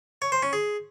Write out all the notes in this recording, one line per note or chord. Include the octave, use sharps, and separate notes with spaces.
C#5
C5
C#4
G#4